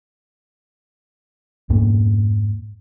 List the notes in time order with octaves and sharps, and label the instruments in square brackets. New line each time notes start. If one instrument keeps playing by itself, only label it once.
[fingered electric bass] F2 G#2 A#3